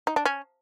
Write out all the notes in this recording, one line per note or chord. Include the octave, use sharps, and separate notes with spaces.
D#4
D4
C#4